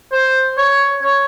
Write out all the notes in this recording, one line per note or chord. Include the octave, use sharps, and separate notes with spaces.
C5
C#5
C#5